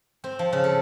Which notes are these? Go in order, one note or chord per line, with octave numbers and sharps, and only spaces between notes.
C4
F3
C#3
A4